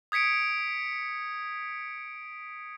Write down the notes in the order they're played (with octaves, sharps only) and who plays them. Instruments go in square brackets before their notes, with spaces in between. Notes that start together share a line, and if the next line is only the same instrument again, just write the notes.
[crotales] D#6 G#6 B6 C#7 D7